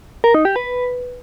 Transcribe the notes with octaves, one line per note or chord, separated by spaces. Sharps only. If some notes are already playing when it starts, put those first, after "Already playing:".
A#4
D#4
G4
B4